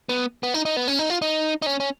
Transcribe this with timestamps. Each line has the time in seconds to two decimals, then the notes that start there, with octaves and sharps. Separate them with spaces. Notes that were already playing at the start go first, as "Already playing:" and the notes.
0.09 B3
0.43 B3
0.54 D#4
0.65 D#4
0.77 B3
0.88 C#4
0.99 D#4
1.10 F4
1.22 D#4
1.62 D#4
1.66 C#4
1.80 C#4